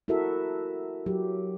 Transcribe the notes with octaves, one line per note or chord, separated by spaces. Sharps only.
E4 F#4 A4 A#4 E5
F#3 G4